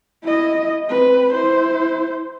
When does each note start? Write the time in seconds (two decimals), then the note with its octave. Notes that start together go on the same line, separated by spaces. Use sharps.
0.23 E4 D#5
0.85 C4 B4
1.33 E4 C5